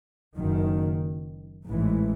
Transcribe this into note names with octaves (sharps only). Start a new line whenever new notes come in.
F#1 F#2 D#3
A1 G#2 E3 G#3